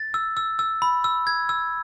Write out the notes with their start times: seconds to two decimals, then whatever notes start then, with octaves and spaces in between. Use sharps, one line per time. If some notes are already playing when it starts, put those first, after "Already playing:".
Already playing: A6
0.14 E6
0.37 E6
0.59 E6
0.82 B5
1.04 E6
1.27 G#6
1.49 E6